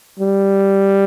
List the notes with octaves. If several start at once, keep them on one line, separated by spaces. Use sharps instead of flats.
G3